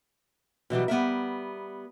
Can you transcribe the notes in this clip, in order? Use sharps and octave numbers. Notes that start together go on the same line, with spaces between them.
B2 E3 F#3 G3
G3 B3 A#4 E5